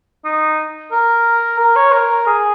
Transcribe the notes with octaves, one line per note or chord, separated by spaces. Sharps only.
D#4
A#4
A#4
C#5
A#4
G#4